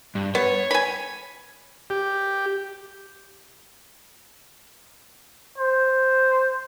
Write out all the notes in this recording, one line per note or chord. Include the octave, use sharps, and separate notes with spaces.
G2
B3 C#5
G#5 B5
G4
C5